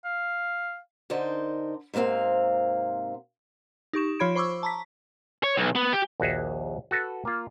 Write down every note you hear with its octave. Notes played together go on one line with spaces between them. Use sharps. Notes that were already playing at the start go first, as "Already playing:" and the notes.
F5
D3 D4 D#4 A#4 C5
G#2 C3 A#3 C4 F5
D#4 G4 C#6 E7
F3 F4 C#5 B5 G#6 D7
C5 B5 C#6 D6 E6
A5 A#5 B6
C#5
B1
B3
G4
A#1 D#2 F#4 G#4 E5
F#4 A4 B4
A#3 F4